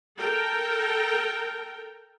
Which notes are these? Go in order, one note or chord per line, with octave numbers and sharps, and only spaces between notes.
A4 A#4 G5